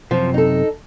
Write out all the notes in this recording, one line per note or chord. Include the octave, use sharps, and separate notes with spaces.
F#2 C3 F3
D#4 A4